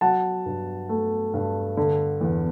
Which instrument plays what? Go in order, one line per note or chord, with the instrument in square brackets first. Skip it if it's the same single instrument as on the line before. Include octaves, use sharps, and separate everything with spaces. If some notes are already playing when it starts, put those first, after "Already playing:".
[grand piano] F#3 F#5 A5
G2
A3
G2
D3
E2